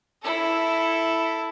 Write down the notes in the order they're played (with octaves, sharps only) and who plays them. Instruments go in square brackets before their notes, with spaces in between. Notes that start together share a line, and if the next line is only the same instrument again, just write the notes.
[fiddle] E4 A4